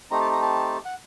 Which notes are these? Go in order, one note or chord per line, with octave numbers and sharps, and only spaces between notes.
A3 C4 D#4 G4 A#5
A5
A#5
A5
F#5